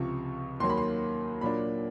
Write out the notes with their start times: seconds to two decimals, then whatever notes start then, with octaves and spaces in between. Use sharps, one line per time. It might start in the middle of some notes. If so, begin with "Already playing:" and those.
Already playing: C#2 C3 F3 C#6
0.60 D#2 D#3 F#3 A#3 C6
0.69 B5
0.77 C6
1.41 A#2 F#3 A#3 D4 B5